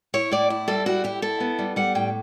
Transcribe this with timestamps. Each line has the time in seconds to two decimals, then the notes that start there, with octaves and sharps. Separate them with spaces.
0.14 E4 C#5
0.31 A2 D5
0.50 E4
0.68 G3 A4
0.86 E4 F#4
1.04 E4 G4
1.22 E4 A4
1.40 B3
1.59 G3
1.76 G3 F#5
1.95 A2 G5